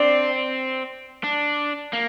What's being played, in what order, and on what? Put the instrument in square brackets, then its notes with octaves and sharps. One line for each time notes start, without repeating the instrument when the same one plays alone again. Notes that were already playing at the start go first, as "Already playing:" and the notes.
Already playing: [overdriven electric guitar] C4 [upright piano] D4 D5
[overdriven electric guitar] D4
A#3